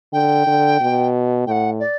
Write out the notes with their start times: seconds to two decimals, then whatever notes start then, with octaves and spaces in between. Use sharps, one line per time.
0.13 D3 G5
0.47 D3
0.80 B2
1.47 A2 F#5 G5
1.80 D5